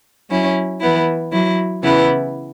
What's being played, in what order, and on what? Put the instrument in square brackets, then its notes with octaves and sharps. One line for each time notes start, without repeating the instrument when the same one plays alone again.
[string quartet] F#3 C#4 E4
E3 B3 E4
F#3 E4
C#3 E3 B3 E4